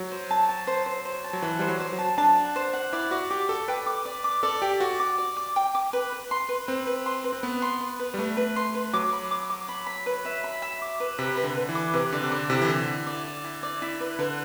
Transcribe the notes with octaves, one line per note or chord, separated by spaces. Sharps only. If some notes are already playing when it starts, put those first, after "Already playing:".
Already playing: F#3
C5
A5
A5
C5
C5
C5
A5
F#3
E3 F#5
G3 C5
F#3
C5
F#3
A5
D4 A5
F#5
C5
F#5
E4 D5
F#4 D5
G4 D6
A4 D5
B4 G5
D6
D5
D6
A4 D5
G4 G5
F#4 D5
D6
D5
D6
G5
D6
B4
B4
C6
B4
C4 B4
B4
C6
B4
C4
B3 B4
C6
B4
B4
G3
A3 B4
B4
C6
B4
F#3 D6
B5
D6
D6
B5
B5
B4
E5
B5
E5
D6
B4
C3 B5
B4
D3
B4
E3
D6
C3 B4
D3 D5
C3
D3 D5
C3 E4
E3
D3 E4
E4
D5
D5
E4
D5
E4
B4
D3 B4